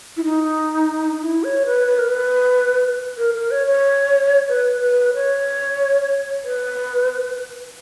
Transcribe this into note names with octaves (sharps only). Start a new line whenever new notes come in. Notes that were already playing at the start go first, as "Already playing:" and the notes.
E4
D#4
E4
C#5
B4
B4
A#4
B4
A#4
A#4
C#5
C#5
B4
B4
C#5
B4